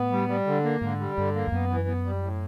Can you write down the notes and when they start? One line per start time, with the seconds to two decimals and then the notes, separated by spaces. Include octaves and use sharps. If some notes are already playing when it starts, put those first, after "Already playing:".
Already playing: A2 B3
0.12 G3
0.29 G3
0.47 D3
0.64 A#3
0.81 G#2 D3
1.00 G3
1.17 G2 D3
1.35 A#3
1.47 F2
1.52 F#2 B3
1.70 E3
1.88 B3
2.05 G3
2.23 A2